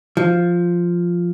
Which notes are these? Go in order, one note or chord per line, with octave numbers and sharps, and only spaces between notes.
F3